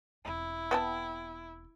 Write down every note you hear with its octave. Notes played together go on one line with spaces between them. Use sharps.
E1 C4 E4
B3 G5 A5